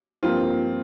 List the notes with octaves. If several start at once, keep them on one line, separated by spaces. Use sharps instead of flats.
G2 F3 A#3 C4 F4